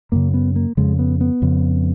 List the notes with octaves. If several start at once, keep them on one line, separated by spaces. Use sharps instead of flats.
F#2 C#3 A#3
B3
A#3
F2 C#3 G#3
B3
B3
F2 C#3